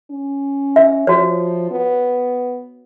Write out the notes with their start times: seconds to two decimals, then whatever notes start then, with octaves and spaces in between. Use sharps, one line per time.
0.10 C#4
0.76 E5
1.07 F3 F#4 C#5
1.71 B3